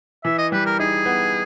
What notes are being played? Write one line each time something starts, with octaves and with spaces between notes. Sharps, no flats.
E3 E5
D#5
G3 B4
A#4
D#4 G#4
B3